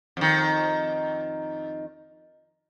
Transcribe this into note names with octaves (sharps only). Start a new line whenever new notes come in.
F2 D#3